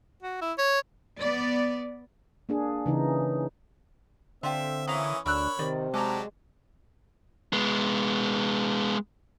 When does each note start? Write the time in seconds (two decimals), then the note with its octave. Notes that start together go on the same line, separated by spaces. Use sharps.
0.22 F#4
0.41 E4
0.58 C#5
1.18 B3 D5
2.49 A#3 D4 G#4
2.86 C#3 E3 D#4
4.43 D3 C4 F4 G4 E5
4.87 E3 C#4 E4 A#4 F5 D#6
5.26 D2 D4 A#4 C#5 B5 E6 F#6
5.59 C3 D#3 D5
5.94 F#3 G#3 G4 A4 D5 A#5
7.53 G#3 B3